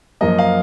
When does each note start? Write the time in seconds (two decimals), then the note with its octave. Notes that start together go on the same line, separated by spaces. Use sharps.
0.21 F#2 F3 A#3 D#5
0.38 F5